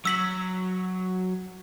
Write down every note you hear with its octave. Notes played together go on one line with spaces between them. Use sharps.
F#3 E6 B6 F#7